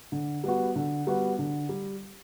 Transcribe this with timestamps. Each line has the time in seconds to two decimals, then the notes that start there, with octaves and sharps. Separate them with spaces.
0.12 D3
0.44 G3 B3 F#4
0.76 D3
1.07 G3 B3 F#4
1.39 D3
1.69 G3